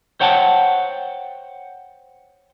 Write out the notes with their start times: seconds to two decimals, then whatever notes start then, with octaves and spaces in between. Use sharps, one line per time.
0.20 C5 C#5 F#5 G5 A5